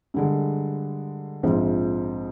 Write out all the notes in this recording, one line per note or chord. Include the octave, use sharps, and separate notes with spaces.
G2 D3 G#3
A#1 G#2 F3 C4